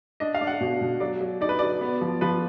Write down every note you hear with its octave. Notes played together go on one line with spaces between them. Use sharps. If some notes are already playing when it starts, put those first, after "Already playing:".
D4 D#5
F5
D4
F#5
B2
B2
F#3 D5
F#3
D#4 D5
B4
F#3 D5
B3
F3
F3 B4